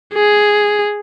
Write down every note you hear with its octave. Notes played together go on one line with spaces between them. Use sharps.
G#4